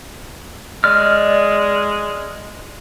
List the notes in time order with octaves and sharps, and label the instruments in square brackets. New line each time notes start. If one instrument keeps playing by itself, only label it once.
[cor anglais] G#3 [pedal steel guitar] D5 F6